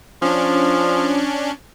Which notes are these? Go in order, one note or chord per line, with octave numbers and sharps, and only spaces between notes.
F3 C#4 D4